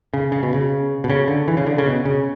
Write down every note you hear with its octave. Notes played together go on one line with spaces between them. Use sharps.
C#3
C#3
B2
C#3
B2
C#3
D3
E3
C#3
D3
C#3
B2
C#3